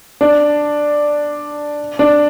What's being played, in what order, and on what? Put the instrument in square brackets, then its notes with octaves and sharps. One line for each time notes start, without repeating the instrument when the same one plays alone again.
[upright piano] D4
D4